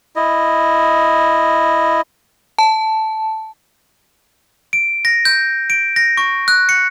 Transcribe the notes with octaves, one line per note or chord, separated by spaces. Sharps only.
E4 D#5
A5
D7
A#6
G6
D7
A#6
C#6
F#6
C#7